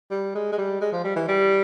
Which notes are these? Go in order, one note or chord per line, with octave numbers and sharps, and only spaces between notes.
G3
G#3
G#3
G3
G#3
F3
G3
E3
G3